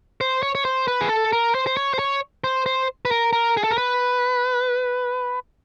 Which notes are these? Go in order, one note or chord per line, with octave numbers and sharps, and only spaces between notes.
C5
C#5
C#5
C5
B4
G#4
A4
A#4
C5
C5
C#5
C5
C#5
C5
C5
B4
A#4
A#4
G#4
A4
A#4
B4